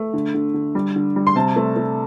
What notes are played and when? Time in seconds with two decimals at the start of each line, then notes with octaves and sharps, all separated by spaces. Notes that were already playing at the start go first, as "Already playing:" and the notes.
Already playing: A3
0.14 D3
0.34 D3
0.54 D3
0.75 G3
0.96 D3
1.16 G3
1.27 C6
1.36 C3 A5
1.56 A3
1.76 A3